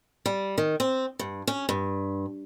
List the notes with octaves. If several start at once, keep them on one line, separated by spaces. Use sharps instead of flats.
G3
D#3
C4
G2
C#4
G2